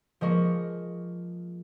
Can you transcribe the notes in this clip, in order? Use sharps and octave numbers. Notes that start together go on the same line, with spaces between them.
F3 G#3 A#3 C#6